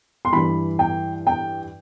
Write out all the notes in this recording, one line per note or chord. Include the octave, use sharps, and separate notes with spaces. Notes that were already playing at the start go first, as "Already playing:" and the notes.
C6
G2 E3 B5
G5
G5